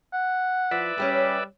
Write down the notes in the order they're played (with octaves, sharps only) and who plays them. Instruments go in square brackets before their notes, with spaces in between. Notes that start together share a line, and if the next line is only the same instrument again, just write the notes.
[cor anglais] F#5
[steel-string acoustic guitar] F3 [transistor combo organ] B4 D5 E5
[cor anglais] G3 [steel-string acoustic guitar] C#4 G4 G#4